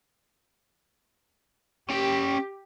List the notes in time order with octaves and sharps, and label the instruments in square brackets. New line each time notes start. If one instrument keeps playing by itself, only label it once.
[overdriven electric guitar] C#4 G5 [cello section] G4